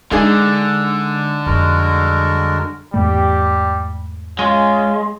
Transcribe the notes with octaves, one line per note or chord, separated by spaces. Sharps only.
D3 G#3 D4 D#4 G#4
F2 G3 G#3 F#4 A#4
E2 G#2 G3 A3 G4
G#3 C#4 F4